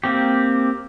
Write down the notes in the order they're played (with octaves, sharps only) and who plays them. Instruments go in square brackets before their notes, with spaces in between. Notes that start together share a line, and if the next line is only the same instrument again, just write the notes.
[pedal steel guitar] A#3 C4 G4